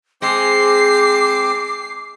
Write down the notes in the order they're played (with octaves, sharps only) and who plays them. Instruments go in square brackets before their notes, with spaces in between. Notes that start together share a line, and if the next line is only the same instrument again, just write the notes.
[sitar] G#3 [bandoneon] C4 C5 [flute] D6 [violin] C7